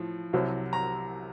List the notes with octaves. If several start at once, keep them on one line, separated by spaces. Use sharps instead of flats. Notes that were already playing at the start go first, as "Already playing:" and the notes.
Already playing: A2 F3
C2 C3 F#3
A#5